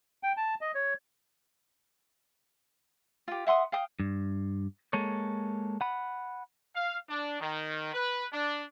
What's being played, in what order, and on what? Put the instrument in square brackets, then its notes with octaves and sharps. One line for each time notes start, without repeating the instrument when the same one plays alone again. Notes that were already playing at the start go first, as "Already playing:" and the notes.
[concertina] G5
A5
D#5
C#5
[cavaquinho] F4 G4
E5 F#5 C6 D#6
F5 G5 D#6
[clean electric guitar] G2
G#3 A#3 A4 C#5
F#5 B5
[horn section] F5
D4
D#3
B4
D4